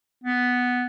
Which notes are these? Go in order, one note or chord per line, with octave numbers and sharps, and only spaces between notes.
B3